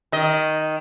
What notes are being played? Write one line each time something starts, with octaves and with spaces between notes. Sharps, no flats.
D#3 D#5